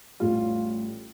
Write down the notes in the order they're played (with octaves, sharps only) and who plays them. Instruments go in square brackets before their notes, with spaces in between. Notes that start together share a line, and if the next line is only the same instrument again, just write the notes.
[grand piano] A1 A2 G3 F4